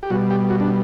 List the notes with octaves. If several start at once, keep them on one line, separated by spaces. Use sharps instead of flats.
G4
B2 G3 F#4
G4
F#4
D4